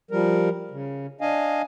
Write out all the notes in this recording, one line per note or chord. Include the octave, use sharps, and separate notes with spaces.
F3 G3 A#4
C#3
D4 D#5 F5 G#5